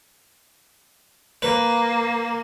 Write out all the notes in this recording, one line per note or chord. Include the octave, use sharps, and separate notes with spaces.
A#3 B4